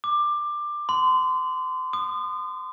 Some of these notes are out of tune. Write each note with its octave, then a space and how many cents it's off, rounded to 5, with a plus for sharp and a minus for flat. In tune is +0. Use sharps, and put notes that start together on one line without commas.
D6 +15
C6 -30
D#6 -35